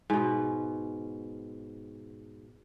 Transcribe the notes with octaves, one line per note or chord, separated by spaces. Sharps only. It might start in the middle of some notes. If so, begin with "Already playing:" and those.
G#2 B2